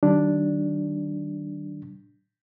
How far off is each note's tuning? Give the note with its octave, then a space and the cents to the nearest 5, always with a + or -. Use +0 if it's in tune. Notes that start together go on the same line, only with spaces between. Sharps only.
D#3 -10 G3 -40 D4 +0